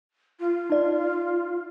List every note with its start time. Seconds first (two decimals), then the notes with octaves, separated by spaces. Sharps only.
0.40 F4
0.70 D#4 D5